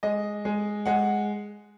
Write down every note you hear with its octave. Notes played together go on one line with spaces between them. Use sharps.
G#3 D#5
G#3
G#3 F#5